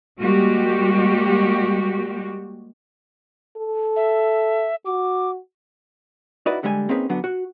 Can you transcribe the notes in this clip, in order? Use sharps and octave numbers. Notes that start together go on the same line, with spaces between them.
G3 G#3 A#3 F#4 G4
A4
E5
F#4 D6
D#4 E4 F#4 B4 D5 D#5
D3 G3 G#3 G#5
A#3 C4 C#4 D#4 G#4 B4
D3 F#3 B3 D4
F#4